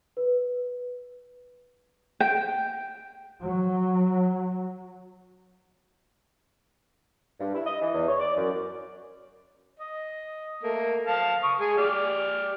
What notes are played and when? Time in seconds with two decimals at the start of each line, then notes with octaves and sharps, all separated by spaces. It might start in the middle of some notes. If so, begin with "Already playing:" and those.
0.17 B4
2.20 G5
3.45 F#3
7.40 G2
7.54 E4
7.66 D#5
7.81 E3
7.94 E2
8.08 C#5
8.20 D5
8.37 F#2
9.80 D#5
10.63 A3 A#3
11.07 F5 A5 F6
11.43 C#6 D#6
11.60 G#3 G#4 G#5
11.78 G4 D5 F6